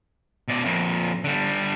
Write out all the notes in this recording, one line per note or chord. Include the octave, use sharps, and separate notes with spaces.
B2 D5
F2 A#2
D3 G3